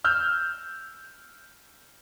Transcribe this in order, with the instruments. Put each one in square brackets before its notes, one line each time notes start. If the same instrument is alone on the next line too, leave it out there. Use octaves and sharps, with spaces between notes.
[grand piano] E6 F6 G6